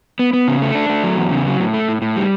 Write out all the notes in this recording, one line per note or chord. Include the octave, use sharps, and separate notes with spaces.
B3
B3
C#3
A3
D4
A3
F#3
E2
C#3
F#3
A2
A3
A2
A2
G3